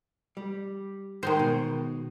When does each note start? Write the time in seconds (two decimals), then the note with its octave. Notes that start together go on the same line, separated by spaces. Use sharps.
0.37 G3
1.23 D#3 G#3 C5
1.39 B2